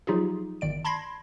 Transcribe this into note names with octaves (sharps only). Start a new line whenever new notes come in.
F3 F#3 D#4 F4 G4 G#4
G1 D#3 D5 D7
A5 B5 C6 G#6 A#6 C7